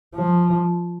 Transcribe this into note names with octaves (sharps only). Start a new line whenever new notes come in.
F3